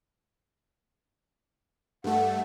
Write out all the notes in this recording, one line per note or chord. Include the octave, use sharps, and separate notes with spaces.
G2 A3 F#5